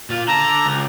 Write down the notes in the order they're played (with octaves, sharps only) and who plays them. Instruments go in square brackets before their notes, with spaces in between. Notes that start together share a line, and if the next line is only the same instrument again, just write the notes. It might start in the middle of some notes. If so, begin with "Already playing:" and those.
[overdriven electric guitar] A#2 F4
[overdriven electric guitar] D3 A5 [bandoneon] A#5
[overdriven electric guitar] C#2